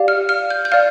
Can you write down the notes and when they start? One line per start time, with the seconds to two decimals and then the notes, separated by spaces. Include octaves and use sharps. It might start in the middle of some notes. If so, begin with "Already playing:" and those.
Already playing: G4 D5 F5
0.08 F6
0.29 F6
0.50 G6
0.65 G6
0.72 D5 F5 F6